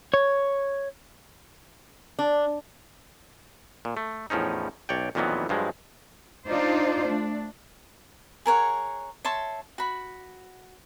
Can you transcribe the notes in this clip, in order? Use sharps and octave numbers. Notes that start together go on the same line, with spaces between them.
C#5
D4
A#2
A3
E2 A2 F3 C#4 D#4
B1 C#5 D5 G5
F2 A#2 D#3 E3 F#3 B3
G2 F3 F#3 G#3
D4 D#4 F4 C5 D5
A3 D4
G#4 A#4 C#5 F#5
C#5 E5 A5 C6
F#4 B5